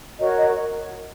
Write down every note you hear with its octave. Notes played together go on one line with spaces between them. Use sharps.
F#4 A#4 C#5 D#5
D#5